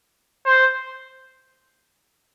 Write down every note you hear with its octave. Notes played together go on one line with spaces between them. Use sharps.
C5